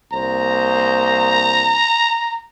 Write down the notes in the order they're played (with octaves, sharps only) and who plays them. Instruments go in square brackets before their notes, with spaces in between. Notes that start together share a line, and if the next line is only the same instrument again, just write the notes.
[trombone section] C2 A#3 C5 [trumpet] A#5